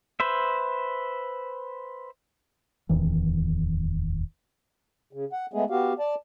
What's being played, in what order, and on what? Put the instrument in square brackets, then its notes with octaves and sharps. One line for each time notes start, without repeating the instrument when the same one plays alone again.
[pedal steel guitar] B4 C5 E5
[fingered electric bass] D1 E2 D#3 E3
[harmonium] C#3
F#5
G#3 A3 B3 G#4
B3 F#4 G4 F5
D5 A5